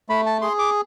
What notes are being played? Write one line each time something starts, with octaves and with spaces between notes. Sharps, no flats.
A3 B5
A5
G#4 C6
D6